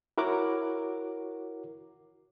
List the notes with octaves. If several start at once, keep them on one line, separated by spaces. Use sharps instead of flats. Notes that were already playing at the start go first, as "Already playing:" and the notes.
E4 F#4 A#4 C#5 F#5 D6